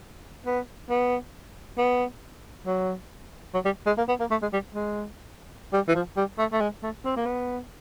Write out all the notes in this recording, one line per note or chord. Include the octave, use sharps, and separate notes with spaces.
B3
B3
B3
F#3
F#3
G3
G#3
A#3
B3
A#3
A3
G#3
G3
G#3
G3
E3
F3
G3
A3
A3
G#3
A3
C4
A#3
B3